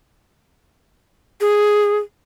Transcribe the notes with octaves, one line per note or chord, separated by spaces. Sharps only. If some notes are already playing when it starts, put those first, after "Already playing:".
G#4